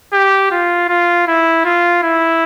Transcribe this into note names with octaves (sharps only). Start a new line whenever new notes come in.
G4
F4
F4
E4
F4
E4